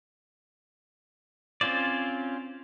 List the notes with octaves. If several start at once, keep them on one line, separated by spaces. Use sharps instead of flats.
C4 C#4 F4 C5 D5